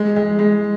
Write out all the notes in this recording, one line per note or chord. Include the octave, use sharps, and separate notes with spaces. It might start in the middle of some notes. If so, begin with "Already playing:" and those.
Already playing: G#3
G#3
G#3